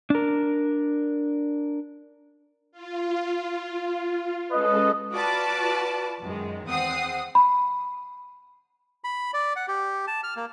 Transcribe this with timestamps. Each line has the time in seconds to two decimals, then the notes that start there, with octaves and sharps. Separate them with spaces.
0.10 D4 A#4
2.72 F4
4.51 G#3 C#4 A4 B4 D#5
5.13 F4 F#4 B4 D5 A5 D6
6.22 F#2 D#3 G#3
6.66 E2 C4 F#5 D#6 C7
7.35 B5
9.04 B5
9.34 D5
9.56 F#5
9.68 G4
10.07 A5
10.24 F6
10.37 A#3